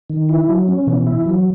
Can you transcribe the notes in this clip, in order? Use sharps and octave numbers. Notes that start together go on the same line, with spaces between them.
D#3
E4
F#3
C#4
B2 E3
E4
F#3